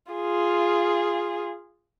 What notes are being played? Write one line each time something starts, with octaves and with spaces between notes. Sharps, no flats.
F4 G#4